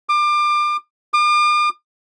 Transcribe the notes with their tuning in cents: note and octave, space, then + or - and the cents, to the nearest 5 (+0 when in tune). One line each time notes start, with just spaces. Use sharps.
D6 +30
D6 +45